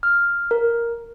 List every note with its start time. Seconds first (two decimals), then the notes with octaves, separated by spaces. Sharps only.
0.03 F6
0.51 A#4